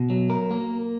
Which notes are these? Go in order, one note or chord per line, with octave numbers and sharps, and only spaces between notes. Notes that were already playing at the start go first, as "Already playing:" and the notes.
Already playing: B2
F#3
A#4
A#3